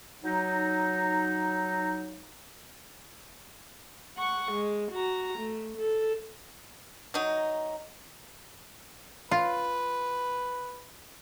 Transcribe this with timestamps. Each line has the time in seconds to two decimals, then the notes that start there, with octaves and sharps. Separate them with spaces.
0.23 F#3 D#4
4.18 F#5 C#6
4.52 G#3
4.92 F#4 A#5
5.39 A3
5.78 A4
7.14 F#3 D#4
9.31 F4 B4